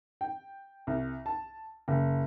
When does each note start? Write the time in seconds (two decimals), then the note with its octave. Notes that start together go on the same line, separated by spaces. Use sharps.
0.21 G5
0.87 C2
1.26 A5
1.88 F#1